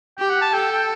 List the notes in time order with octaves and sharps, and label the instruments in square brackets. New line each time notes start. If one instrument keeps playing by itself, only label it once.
[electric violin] G4 [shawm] G5
[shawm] F#5
A5
[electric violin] A4 [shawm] G5
[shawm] G5